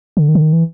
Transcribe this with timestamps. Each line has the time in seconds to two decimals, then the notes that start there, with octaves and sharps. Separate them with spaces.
0.17 D3
0.29 D#3
0.35 D3
0.42 D#3
0.53 E3